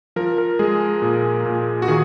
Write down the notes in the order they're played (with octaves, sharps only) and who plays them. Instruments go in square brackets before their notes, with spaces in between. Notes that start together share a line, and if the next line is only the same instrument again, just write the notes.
[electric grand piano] F3 A#4
A#4
G#3 G#4
A#2
A#2
F#4
D#3 G#4